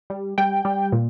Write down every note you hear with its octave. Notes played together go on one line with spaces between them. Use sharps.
G3
G3 G5
G3
A#2